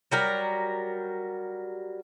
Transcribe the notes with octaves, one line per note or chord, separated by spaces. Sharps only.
F#3 G3 A#4